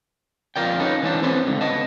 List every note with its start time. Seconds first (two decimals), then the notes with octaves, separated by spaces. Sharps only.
0.56 F2 F4 A#4 D5 G5
0.79 C#4 D#4 A4 B4
1.03 E3 C#4 D4 C5
1.23 C4 C#4 A4 B4 C#5 C6
1.47 C#2 D3
1.61 B3 D#5 A5